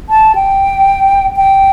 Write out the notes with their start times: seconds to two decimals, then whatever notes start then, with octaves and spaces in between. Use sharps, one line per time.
0.10 A5
0.35 G5
1.36 G5